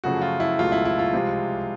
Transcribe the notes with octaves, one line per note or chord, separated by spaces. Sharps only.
F#2 C#3 F3 A3 F#4
F4
E4
C#2 B2 F#3 A3 F4
E4
E4
F4
C2 C3 F3 G#3